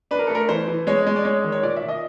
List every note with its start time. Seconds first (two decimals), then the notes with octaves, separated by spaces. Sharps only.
0.11 D4 B4
0.19 A#4
0.27 A3 A4
0.35 A#4
0.49 E3 C5
0.68 E3
0.87 G#3 C#5
1.07 G#3
1.16 D5
1.25 G#3 C#5
1.44 D#3
1.52 C#5
1.63 A#2 D5
1.76 E5
1.82 A#2
1.88 D#5